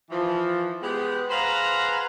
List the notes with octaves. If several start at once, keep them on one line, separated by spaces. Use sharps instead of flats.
E3 F3
G#3 B3 G4
G#4 B4 C5 F5 F#5 A#5